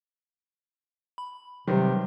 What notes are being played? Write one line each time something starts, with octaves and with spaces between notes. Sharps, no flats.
B5
C3 D#3 F#3 G3 B4 C5